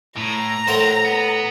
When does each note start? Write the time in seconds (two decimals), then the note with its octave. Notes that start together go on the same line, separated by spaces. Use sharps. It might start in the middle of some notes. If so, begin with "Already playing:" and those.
0.17 A2 A#5
0.68 A2 A4 A#4 C5 F#5
1.05 B3